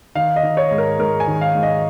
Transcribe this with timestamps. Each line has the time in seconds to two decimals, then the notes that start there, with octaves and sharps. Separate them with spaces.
0.15 D#3 F5
0.36 D#5
0.43 D#3
0.57 C#5
0.71 G#2
0.78 A#4
0.99 G#2 A#4
1.20 G#5
1.27 D#3
1.41 F5
1.55 G#2
1.63 D#5